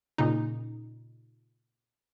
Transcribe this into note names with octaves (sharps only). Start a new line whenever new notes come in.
A#2 C#3 D#4